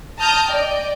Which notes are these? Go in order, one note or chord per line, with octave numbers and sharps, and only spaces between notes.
A5 A#5 D#6 F6 G6
D5 D#5 G5